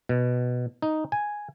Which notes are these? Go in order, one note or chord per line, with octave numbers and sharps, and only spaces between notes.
B2
D#4
G#5